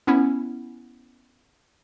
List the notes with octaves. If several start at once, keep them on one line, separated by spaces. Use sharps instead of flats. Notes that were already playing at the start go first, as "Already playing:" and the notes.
B3 C#4 E4